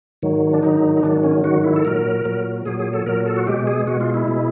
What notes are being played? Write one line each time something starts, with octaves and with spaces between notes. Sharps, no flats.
G#2 D#3 F#3
D4
G#2 D#3 F#3 D#4
D#4
G#2 D#3 F#3 D4
C#4
G#2 D#3 F#3 F#4
E4
A4
A#2 F#3 A#4
A#2 F#3
A#2 F#3 G#4
G#4
A4
A#2 F#3 A#4
A4
F#4
B2 G#3 G4
G#4
B2 G#3 F#4
F4
E4
B2 G#3